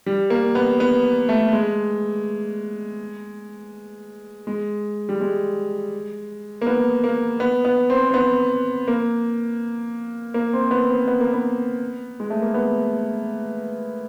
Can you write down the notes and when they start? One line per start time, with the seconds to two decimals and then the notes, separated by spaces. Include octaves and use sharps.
0.06 G3
0.30 A#3
0.55 B3
0.80 B3
1.29 A3
1.53 G#3
4.47 G#3
5.09 G3
5.21 G#3
6.62 A#3
6.67 B3
7.04 A#3
7.40 B3
7.65 B3
7.90 C4
8.09 C4
8.14 B3
8.88 A#3
10.34 A#3
10.53 C4
10.71 B3
10.90 C4
11.08 B3
11.20 A#3
11.34 B3
12.20 G#3
12.30 A3
12.42 A#3
12.54 B3